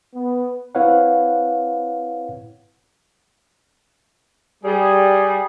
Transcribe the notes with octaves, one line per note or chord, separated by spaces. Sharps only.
B3
C4 E4 B4 C#5 F5 F#5
G3 G#4